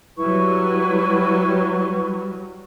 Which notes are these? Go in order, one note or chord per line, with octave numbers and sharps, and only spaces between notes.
F#3 G3 E4 B4 C#6